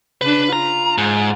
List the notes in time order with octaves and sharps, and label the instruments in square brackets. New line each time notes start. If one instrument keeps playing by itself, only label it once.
[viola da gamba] C#3 D4 [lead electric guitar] B4
[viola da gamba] F4 [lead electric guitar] A#5
[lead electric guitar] G#2